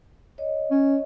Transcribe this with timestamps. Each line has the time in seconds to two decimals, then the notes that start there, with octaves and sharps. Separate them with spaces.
0.38 C#5 D#5
0.71 C#4